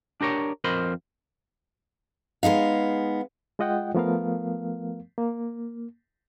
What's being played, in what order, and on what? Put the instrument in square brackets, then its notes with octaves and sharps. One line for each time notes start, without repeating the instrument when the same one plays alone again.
[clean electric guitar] D4 G4 A#4 C#5
F2 A#4 C5 D#5 B5 C6
[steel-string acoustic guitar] G#3 B3 D#4 F5
[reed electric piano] G#3 F4 D#5 F#5 G5
F3 A3 B3 A#4 F5
A#3